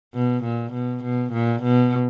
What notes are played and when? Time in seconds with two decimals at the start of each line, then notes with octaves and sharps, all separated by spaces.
0.14 B2
0.44 A#2
0.73 B2
1.04 B2
1.33 A#2
1.63 B2